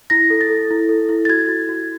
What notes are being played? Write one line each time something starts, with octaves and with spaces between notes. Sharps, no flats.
E4 A#6
A4
A6
A4
E4
A4
E4
A6
F#4 G#6
F#4
F#4